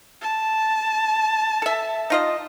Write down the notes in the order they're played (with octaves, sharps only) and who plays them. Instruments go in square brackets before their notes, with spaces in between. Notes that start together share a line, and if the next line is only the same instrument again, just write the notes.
[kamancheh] A5
[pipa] A4 E5
D#4 F4 D#5